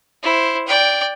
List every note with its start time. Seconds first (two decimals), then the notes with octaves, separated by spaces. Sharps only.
0.23 E4 C5
0.67 D5 G5